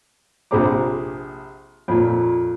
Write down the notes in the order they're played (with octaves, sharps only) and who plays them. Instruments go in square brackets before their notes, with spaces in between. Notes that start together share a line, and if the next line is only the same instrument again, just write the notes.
[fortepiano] A#1 C3 G#4 C5 A#5 D6
F2 A#2